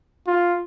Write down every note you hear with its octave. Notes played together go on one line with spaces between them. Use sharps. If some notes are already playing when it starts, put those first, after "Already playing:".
F4